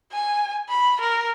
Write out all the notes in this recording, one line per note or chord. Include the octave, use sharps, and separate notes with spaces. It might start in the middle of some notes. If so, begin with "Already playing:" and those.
G#5
B5
A#4